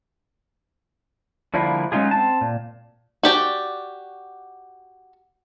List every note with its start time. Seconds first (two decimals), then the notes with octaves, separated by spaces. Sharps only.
1.54 D3 F3 G3 A#3 E4
1.92 F#3 G#3 C#4 D#4 F4 G#4
2.11 C4 A5
2.41 A#2
3.23 F#4 G4 D5